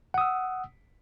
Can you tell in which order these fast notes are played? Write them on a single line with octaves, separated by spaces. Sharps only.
F#5 D#6 E6